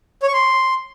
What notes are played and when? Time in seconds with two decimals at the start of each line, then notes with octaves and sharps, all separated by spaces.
0.23 C#5
0.28 C#6
0.33 C6